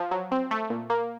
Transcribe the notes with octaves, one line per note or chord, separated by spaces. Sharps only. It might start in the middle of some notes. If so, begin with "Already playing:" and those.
Already playing: F3
F#3
C4
A3
A#2
A#3